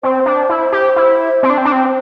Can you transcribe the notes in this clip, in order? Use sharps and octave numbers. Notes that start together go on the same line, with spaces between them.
C4 C5
D4
E4
G4
E4
C4
D4
C4
D4
C4